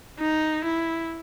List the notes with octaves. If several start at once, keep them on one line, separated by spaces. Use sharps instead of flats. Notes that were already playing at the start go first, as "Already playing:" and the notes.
D#4
E4